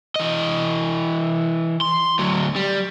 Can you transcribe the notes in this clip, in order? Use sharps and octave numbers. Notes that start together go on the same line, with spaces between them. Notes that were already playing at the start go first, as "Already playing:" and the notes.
E3 D#5
C6
D2 F#3
G3